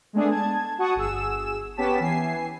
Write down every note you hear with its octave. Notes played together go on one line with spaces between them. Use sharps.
G#3 A3 B3 D4 G#4 A4
A5 G#6
F#4 F#5 A5 C#6 D#6
G1 G#4 E6 E7
B3 C#4 G4 A5 B6 E7
E3 G#5 C7